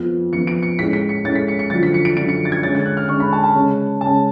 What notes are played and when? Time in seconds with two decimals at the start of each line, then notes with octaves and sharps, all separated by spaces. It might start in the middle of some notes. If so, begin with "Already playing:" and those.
Already playing: F2 F3 B3
0.33 F2 F3 B3 C#7
0.47 D7
0.62 C#7
0.79 A2 G#3 C#4 B6
0.93 B6
1.09 C#7
1.24 A2 G#3 C#4 A6
1.35 B6
1.48 C#7
1.59 C#7
1.70 F#2 D3 F3 A6
1.83 B6
1.94 C#7
2.05 D7
2.17 F#2 D3 F3 D7
2.29 C#7
2.45 A6
2.52 G#6
2.63 D3 G#3 C#4 A6
2.75 A6
2.86 F#6
2.97 F6
3.09 D3 G#3 C#4 C#6
3.20 B5
3.32 A5
3.43 A5
3.55 C#3 G#3 C#4
4.01 C#3 G#3 C#4 A5